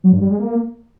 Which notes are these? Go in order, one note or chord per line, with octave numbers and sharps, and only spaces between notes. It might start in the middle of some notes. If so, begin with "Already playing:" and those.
F#3
G2
G3
G#3
A#3